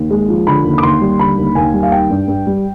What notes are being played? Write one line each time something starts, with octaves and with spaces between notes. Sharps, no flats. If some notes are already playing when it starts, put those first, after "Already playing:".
Already playing: D#2
G#3
F3
D3 B5
D#2
D6
D#2 C6
G3
D3 B5
D#2
D#2 G#5
G3
F5
D#3 G5
G2
G2
G3